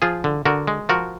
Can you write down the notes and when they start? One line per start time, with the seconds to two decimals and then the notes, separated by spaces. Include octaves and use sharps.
0.02 F3 F4 G#4
0.24 D3
0.45 D3 F#4 A#4
0.67 G#3
0.89 F3 F#4 A#4